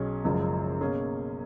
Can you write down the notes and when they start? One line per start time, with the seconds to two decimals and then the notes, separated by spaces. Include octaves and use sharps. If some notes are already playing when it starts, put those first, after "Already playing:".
Already playing: B1 B2 F#3 C#4 G#4
0.24 F#1 F#2 F3 G#3
0.81 B2 A#3 C#4 G#4